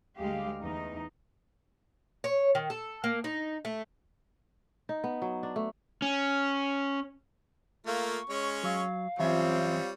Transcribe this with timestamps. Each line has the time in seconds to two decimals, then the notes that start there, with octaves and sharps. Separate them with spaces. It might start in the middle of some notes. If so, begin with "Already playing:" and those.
0.18 D2 G3 G#3 G4 F5
0.60 E2 D#4
2.24 C#5
2.55 D#3
2.70 A4
3.04 A#3
3.24 D#4
3.65 A3
4.89 D#4
5.04 B3
5.22 F#3
5.43 D4
5.56 A3
6.02 C#4
7.87 A3 A#3 F4 C#6
8.30 G#3 C#4 C#5
8.64 F#3 F5
9.19 F#2 E3 G3 C4 F4 C#5 E5